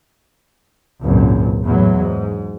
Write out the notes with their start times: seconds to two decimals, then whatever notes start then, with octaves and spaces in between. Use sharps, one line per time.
1.02 G#1 C#2 F#2 A#2
1.65 E2 A2 F#3
1.99 G#2